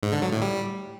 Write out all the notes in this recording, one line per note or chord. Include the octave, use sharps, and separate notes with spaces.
G#2
D3
F#3
A2
G3